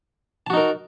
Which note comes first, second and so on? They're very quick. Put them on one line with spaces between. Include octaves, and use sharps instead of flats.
A5 F#4 D#4 A#4